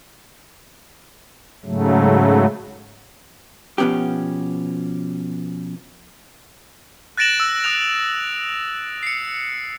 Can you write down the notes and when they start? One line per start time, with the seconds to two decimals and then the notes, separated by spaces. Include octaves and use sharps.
1.65 G#2 C#3 F#3 A3
3.78 B2 F3 B3 C#4 G4
7.17 F#6 A6 A#6 D7 E7 F#7
7.40 E6
7.64 D#6 F#6 F7
9.03 C7 C#7